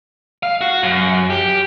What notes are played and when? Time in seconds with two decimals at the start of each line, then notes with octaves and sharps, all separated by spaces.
0.43 F5
0.61 F#4
0.83 F#2
1.30 G4